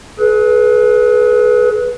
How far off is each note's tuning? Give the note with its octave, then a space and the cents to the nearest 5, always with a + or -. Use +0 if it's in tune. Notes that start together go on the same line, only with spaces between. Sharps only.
G#4 +40 B4 -10